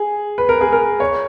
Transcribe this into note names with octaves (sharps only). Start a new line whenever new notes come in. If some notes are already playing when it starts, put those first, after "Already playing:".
Already playing: G#4
B4
A#4
G#4
A#4
C#5